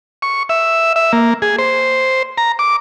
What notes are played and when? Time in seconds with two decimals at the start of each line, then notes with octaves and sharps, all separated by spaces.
0.22 C#6
0.49 E5
0.96 E5
1.13 A#3
1.42 G#4
1.59 C5
2.38 A#5
2.59 D6